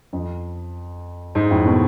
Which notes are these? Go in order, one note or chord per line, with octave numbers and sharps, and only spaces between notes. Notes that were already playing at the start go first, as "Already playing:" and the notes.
F2
G#2
F2 A2
B2